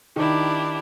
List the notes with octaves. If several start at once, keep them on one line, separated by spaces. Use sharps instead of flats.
D#3 D4 E4 G4